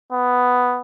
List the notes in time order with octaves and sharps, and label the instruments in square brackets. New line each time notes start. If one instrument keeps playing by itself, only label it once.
[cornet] B3